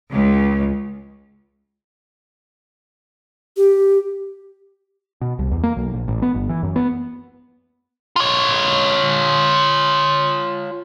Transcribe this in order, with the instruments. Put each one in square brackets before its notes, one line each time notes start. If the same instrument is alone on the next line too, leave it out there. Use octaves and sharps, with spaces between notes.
[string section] C#2
[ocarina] G4
[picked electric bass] B2
C2
E2
A#3
B1
A#1
A1
B3
G1
E3
F#2
B3
[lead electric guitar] F4 C#5